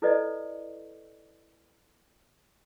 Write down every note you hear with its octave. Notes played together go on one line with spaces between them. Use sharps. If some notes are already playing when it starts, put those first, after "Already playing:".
E4 A4 B4 D5 D#5